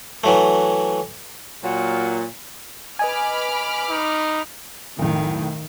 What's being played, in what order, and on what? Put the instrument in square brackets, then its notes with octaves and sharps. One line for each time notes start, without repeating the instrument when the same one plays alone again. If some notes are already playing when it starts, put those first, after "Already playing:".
[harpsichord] E3 F#3 A3
[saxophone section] A#2 F#3
[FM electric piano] B4 D#5 G#5 [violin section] B5 D6 F6
[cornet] D#4
[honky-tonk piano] B1 F2 A2 [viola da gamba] D#3